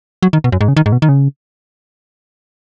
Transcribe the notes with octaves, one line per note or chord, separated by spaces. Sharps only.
F#3
D#3
B2
F#2
G#2
C#3
D#3
G#2
B2
D#3
C#3